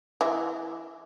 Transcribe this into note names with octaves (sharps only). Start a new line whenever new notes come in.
E3 E5